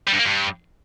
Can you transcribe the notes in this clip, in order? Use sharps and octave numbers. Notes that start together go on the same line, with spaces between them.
G3
G2
A#3
G2